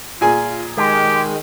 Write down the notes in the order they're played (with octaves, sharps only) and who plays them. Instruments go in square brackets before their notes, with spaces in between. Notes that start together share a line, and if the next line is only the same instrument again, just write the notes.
[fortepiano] A#2 G#4 G#5 [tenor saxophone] F4
[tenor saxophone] D#3 [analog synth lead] G#3 [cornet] G4